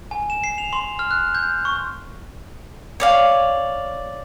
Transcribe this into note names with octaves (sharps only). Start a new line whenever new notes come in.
G#5
E7
C7
F7
C6
F6
F#6
G6
C#6
C#5 D5 F5